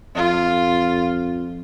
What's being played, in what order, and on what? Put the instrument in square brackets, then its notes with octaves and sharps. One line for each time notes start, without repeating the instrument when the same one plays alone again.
[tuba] F2 [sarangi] F4